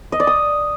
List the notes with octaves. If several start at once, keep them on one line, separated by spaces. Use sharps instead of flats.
D#5
D5
D#6